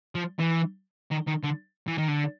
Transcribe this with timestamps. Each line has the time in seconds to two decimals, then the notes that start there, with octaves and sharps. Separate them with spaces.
0.15 F3
0.39 E3
1.11 D#3
1.28 D#3
1.44 D3
1.88 E3
1.98 D#3
2.08 D3